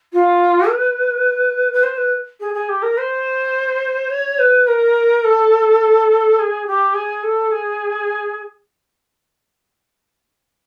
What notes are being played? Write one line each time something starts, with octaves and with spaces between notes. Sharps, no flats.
F4
B4
B4
C5
B4
G#4
G#4
G4
A#4
C5
C#5
B4
A#4
A4
G#4
G4
G#4
A4
G#4